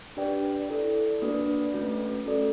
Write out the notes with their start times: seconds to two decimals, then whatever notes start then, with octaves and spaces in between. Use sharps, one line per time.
0.17 D4 G4 B4 D5 G5
0.69 E4 A4 D5
1.22 A#3 D4 F#4 B4 D5
1.74 A3 C#4 F#4 B4
2.26 A3 C#4 F#4 A4 D5